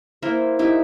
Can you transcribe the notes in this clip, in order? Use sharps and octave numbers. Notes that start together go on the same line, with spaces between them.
A#3 E4 A#4 C5
D#4 E4 G4